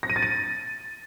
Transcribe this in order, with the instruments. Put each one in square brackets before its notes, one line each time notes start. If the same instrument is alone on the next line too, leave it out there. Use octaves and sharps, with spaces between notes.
[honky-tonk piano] A#6
D#7
A6
D#7